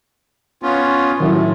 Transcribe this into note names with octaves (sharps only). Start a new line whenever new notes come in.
B3 C#4 F4
A2 D#3 F#3 E4